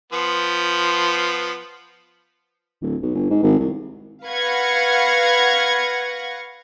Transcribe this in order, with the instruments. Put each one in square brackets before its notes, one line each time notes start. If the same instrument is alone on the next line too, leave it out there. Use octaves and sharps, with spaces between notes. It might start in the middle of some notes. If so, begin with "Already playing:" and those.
[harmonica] F3 B3 C6
[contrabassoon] D1
B1
G1
G#2
G#1
C2
[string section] B4 F5 F#5 C#6 G#6 A#6